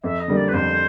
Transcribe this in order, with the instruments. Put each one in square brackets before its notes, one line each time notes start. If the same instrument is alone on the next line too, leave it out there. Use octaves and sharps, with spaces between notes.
[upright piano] F2 [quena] E5
[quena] D#5
[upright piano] D3 G3 A#3
[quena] D5
B4
[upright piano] F2 [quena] C5